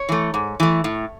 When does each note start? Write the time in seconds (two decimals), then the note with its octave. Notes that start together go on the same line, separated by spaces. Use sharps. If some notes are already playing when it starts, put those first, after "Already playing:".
Already playing: C#5
0.09 E3 A3
0.34 G#2
0.60 E3 A3
0.84 A2